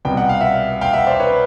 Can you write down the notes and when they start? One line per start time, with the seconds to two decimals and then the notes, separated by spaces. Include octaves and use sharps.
0.05 C2 B2 G3 G5
0.17 F#5
0.29 F5
0.41 E5 F#5
0.81 F5 G5
0.93 E5 F#5
1.07 C5 D5
1.20 B4 C#5